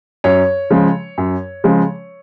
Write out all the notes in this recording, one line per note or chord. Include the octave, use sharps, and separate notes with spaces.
F#2 C#5
C#3 F3 G#3
F#2
C#3 F3 G#3